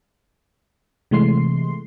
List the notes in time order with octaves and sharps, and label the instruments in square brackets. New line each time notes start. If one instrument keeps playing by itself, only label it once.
[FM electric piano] C3 E3 G#3 A3 C6 C7